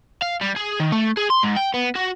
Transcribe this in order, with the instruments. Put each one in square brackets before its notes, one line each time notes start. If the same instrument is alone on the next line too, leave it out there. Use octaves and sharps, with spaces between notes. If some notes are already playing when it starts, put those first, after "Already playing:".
[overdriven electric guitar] F5
G3
G#4
D#3
A3
G#4
C6
G#2
G5
B3
F#4